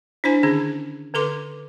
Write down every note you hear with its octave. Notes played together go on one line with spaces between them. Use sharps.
D4 E4 C5 G#5
D3 D#3 C#4 G#4
D3 A4 B4 C6 D6